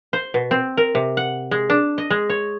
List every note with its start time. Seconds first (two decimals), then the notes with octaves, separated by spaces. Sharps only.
0.13 C5
0.34 B2
0.51 C4
0.77 A#4
0.95 C3
1.17 F#5
1.51 G#3
1.70 D4
1.98 D#5
2.10 G#3
2.29 C#5